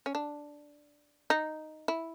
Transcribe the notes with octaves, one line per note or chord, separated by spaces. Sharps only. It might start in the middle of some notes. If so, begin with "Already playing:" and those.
C#4
D4
D#4
E4